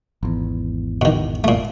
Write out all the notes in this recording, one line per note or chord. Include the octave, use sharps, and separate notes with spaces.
G#1 E2
B2 D#3
A#2 A3